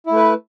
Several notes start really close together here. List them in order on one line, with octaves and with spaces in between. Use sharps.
E4 A3 B4